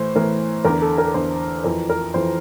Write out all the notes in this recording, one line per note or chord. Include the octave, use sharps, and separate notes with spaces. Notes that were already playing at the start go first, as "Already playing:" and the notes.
Already playing: A2 E3 C5
A2 E3 A#4
E2 D3 A#4
A4
A#4
E2 D3 C5
F2 E3 A#4
A#4
F2 E3 C5